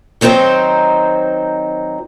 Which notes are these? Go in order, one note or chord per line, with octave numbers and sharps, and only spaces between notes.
D#3 F#3 C4 D#4 C5